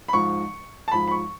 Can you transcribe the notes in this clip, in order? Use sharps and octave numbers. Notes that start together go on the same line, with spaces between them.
B5
G#2 F3 C#6
A5
G#2 F3 B5
B5
C#6